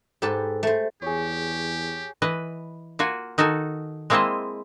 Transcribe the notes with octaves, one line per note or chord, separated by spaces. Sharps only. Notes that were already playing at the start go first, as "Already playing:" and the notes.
G#2 G4 A4 B4 A5
A3 C5
E2 G4 G#4 C#5
E3 B4 D#5
A#3 F4 F#4 G#5
D#3 D#4 F#4 A4 G#5
G#3 A#3 C4 E4 C5 D#5